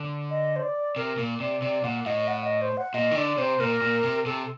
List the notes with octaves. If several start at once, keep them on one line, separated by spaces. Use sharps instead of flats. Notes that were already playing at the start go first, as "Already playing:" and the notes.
Already playing: D3
D#5
C5
D5
C3 A#4
A#2
C3 D5
C3 D5
A#2 F#5
A2 D#5
F#5
D#5
C5
F#5
A#2 D#5
D#3
D3 D5
C3 C5
A#2 A#4
A#2
C3
C3 A4